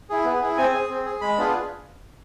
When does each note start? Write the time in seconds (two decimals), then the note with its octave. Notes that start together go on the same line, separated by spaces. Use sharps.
0.10 E4 G#4
0.25 B3
0.41 E4 G#4
0.57 C4 G#5
0.74 G#4
0.90 C4
1.05 G#4
1.21 G#3 B5
1.37 B3 D4 F4 G#4